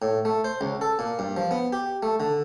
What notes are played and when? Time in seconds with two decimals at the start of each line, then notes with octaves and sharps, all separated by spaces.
0.02 A2
0.25 A3
0.44 C5
0.61 C#2
0.81 A4
0.99 A#2
1.19 G2
1.37 F3
1.51 B3
1.73 G4
2.03 A3
2.20 D3